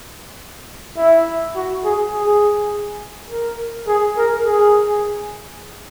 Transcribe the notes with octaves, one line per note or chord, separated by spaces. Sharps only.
E4
F#4
G#4
G#4
A#4
G#4
A#4
G#4